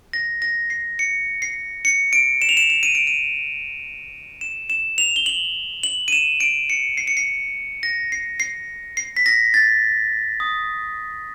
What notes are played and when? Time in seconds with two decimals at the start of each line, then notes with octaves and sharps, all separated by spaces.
0.13 A#6
0.42 A#6
0.70 C7
0.99 C#7
1.42 C7
1.85 C#7
2.13 D7
2.42 E7
2.49 F7
2.57 E7
2.70 E7
2.83 D#7
2.95 D7
3.07 D#7
4.41 E7
4.70 E7
4.98 F7
5.16 G7
5.26 F#7
5.83 F#7
6.08 D#7
6.12 E7
6.40 D7
6.70 C#7
6.97 C7
7.07 C#7
7.17 C7
7.83 A#6
8.12 C7
8.40 C7
8.97 C7
9.17 B6
9.26 A#6
9.54 A6
10.40 D#6